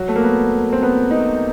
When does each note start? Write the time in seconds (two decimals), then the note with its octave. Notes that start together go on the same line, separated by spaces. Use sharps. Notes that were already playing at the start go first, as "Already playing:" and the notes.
Already playing: F#3
0.09 A3
0.16 A#3
0.24 B3
0.73 C4
0.83 B3
1.11 D#4